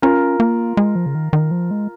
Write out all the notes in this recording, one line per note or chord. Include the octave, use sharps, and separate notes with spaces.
C#4 F4 A#4
A#3
G#3
F3
C#3
D#3
D#3
F3
G#3